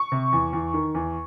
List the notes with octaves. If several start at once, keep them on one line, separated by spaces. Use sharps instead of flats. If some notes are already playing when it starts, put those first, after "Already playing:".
Already playing: C#6
C3
E2
E2
D#3
E2